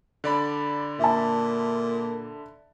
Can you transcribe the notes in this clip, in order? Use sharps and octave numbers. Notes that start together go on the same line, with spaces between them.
D3 D5 B5
A#2 E5 A5